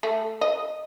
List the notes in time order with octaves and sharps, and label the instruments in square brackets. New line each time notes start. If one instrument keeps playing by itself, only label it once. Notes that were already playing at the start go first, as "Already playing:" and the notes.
[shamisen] A3
D#5